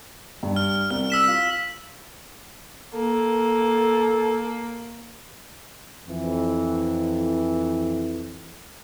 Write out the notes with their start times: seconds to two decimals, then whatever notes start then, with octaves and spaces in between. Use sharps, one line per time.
0.43 G2
0.56 F6
0.90 C2 F6
1.10 E6 B6 E7
1.27 F4
2.94 A#3 A4
6.08 F2 E3